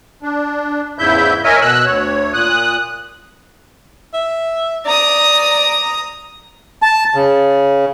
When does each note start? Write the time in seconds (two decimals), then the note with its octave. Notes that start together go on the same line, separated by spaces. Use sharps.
0.23 D4
0.99 E2 G#2 C#3 E4 E5 G6
1.44 A#4 C#5 D#5 E5 G#5
1.62 B2 E6 F#6
1.85 D2 C#5
2.33 A#2 D#6 F#6
4.14 E5
4.86 D5 A#5 D#6
6.82 A5
7.15 C#3